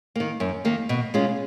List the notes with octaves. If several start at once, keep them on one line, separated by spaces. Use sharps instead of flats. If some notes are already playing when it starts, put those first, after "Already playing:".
D#3 A#3
F#2
D#3 A#3
B2
G#3 C#4 F4